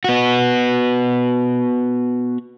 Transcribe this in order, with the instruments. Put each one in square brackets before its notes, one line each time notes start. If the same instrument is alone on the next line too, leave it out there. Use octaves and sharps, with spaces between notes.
[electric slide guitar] B3 F#4